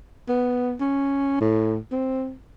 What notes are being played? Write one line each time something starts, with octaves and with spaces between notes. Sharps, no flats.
B3
C#4
A2
C4